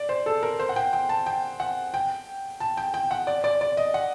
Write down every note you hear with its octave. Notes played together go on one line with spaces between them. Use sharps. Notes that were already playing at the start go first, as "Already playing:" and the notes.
Already playing: D5
C5
A4
A#4
C5
F#5
G5
G5
A5
G5
F#5
G5
A5
G5
G5
F#5
D5
D5
D5
D#5
F#5